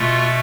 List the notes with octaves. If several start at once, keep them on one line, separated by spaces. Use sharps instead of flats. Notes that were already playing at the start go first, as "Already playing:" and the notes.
Already playing: B2 A3 F4